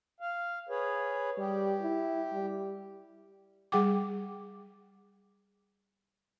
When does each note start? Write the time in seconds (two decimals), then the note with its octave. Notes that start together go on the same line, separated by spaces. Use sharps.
0.21 F5
0.69 G#4 B4 C#5
1.38 G3 G4
1.82 E4
2.33 G3
3.72 G3 G#4 F#5 G5 D6